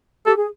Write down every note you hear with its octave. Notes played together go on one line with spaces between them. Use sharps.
G4 A4
G#4